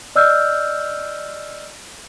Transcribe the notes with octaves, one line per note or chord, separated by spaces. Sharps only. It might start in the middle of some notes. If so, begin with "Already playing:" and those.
D5 D#5 E6 F6 G6